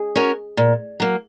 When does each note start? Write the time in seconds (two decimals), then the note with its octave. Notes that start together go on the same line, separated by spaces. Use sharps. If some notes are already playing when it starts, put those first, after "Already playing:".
Already playing: G#4
0.15 C#4 F#4 A#4 C#5
0.57 A#2
1.00 F#3 A#3